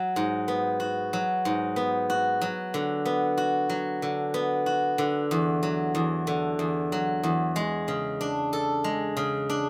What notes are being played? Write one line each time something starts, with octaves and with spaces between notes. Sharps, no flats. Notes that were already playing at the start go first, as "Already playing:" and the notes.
Already playing: F#3
G#2
B3
F#4
F#3
G#2
B3
F#4
F#3
D3
B3
F#4
F#3
D3
B3
F#4
D3
E2
F#3
E2
D3
E2
F#3
E2
G#3
C#3
D4
A4
G#3
C#3
D4